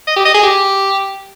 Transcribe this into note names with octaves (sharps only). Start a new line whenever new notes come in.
D#5
G4
D#5
G#4
G4